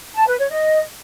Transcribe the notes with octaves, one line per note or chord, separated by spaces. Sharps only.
A5
B4
C#5
D#5